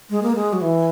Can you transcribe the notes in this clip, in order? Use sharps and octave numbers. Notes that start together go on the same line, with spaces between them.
G#3
A#3
G#3
F#3
E3